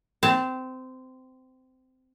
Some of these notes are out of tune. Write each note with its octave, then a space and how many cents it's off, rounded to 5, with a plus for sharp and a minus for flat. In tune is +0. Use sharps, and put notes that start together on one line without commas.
C4 -20 A5 +10